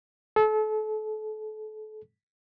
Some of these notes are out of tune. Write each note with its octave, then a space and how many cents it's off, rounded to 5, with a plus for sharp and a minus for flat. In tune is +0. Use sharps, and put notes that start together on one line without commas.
A4 -35